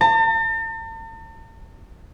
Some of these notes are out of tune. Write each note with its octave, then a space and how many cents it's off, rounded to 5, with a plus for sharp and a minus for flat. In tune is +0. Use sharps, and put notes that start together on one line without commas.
A5 +45